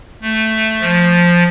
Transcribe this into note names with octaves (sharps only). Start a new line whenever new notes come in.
A3
F3